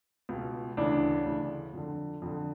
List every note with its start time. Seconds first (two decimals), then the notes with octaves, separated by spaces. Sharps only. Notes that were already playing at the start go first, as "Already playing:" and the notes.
0.29 C#2 B2
0.77 D2 C#3 E3 D4
1.26 D2 C#3 E3
1.73 F2 D3
2.22 F2 D3